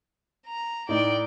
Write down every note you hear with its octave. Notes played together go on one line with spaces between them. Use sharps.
A#5
A2 D#4 D5 G5